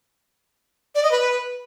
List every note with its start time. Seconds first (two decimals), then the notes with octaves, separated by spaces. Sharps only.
0.95 D5
1.03 D#5
1.11 B4